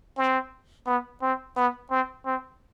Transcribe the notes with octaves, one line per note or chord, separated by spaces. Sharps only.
C4
B3
C4
B3
C4
C4